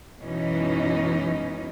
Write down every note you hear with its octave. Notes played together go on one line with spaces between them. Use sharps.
F#2 B2 E3 G#3 C#4 D#4